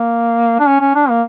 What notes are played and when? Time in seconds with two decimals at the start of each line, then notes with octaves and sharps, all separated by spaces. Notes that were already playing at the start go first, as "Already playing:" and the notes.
Already playing: A#3
0.59 D4
0.67 C#4
0.81 C#4
0.95 D4
1.09 A#3